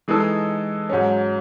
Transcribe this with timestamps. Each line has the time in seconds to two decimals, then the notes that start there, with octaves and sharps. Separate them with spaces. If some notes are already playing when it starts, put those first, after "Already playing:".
0.08 E3 G#3 D#4 A4
0.89 G#2 F#3 C#4